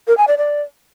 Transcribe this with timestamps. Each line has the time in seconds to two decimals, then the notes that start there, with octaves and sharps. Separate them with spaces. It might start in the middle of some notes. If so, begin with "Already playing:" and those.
0.07 A#4
0.17 G#5
0.27 D5
0.37 D5